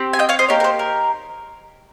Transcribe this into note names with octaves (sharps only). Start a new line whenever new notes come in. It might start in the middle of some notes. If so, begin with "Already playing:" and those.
Already playing: C4 G4
G#5
D#5 G5
C#5 F5
C5 D#5
A#3 D#4 G4 A#4 C#5
A#4
C5
A#4